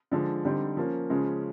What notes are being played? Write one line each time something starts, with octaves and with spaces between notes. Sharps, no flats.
D3 F3 G#3
D3 G3 C4 D#4
F3 A#3 C#4
C#3 F3 G#3 C#4